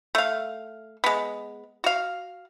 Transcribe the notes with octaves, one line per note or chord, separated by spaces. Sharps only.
A3 F5
G#3 B3
F#4 F5